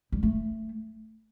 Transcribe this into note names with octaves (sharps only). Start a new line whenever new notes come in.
G3
A3